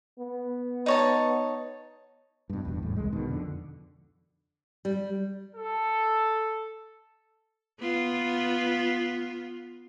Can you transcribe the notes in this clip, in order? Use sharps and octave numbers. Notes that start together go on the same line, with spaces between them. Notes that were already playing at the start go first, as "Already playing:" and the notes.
B3
D#4 C#5 A5
G2 B2
D1 E2 G2
G#1 E2 A2
C2 G#3
B2 D#3
F2 D3
G3
A4
B3 F4